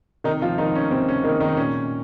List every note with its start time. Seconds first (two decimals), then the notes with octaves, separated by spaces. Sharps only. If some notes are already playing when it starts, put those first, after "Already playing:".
0.24 C3 D#3 D#4
0.42 F3 F4
0.58 D#3 F3 D#4
0.75 C#4
0.91 C3 C4
1.08 C#4
1.24 D#3 A#3 D#4
1.40 D#3 D#4
1.57 A#2 C#4